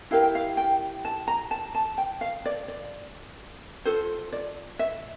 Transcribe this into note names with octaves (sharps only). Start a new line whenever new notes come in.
E4 G4 A#4 F5
G5
F5
G5
A5
A#5
A5
A5
G5
F5
D5
D5
F4 A4 C5
D5
E5